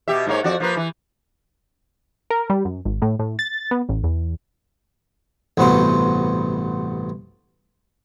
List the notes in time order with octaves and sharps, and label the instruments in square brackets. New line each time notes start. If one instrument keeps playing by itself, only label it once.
[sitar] B2 G4 E5
G#2 A#3 C#5
F2 F#4 D5
F3 A#3 B4
E3
[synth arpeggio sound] A#4
G3
F#2
G#1
A2
A2
A6
B3
A1
E2
[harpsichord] A1 G2 C3 B3 F#4 C5